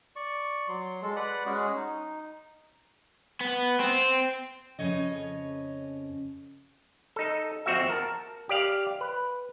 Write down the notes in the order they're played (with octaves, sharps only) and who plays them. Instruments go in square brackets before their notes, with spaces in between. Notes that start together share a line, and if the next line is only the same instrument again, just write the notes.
[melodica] D5 C#6
F#3 C6
G#3 A4
B4 D5 F#5
G#3 C#4 F#4 G#4
D#4
[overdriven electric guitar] B3
C4
[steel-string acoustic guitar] F2 C#3 C#4 C#5 D#5
[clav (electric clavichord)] D#4 A4
F2 C4 F#4 E5
A#4 A5
G4 D5 F5
B4